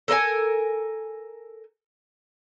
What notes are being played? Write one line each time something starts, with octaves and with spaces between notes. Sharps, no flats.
A4 A#4 D#5 G#5